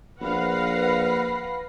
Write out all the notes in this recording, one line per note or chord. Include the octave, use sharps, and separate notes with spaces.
A#1 B4 F5 F#5 B5 A#6 C7